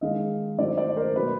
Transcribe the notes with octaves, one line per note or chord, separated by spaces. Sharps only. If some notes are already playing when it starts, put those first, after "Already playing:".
D#3 G#3 D#5 F5
D#3 F#3 A3 C5 D5
C5 D5
A#4 C5
B2 F#3 A#3 B4